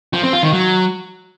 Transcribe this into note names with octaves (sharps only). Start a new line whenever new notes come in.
F3
C4
F4
D#3
F#3